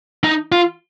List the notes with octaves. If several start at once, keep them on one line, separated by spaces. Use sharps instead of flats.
D#4
F4